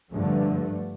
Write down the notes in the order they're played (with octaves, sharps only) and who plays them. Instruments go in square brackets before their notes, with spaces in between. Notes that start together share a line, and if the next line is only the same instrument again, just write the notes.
[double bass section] G2 D3 F3 A3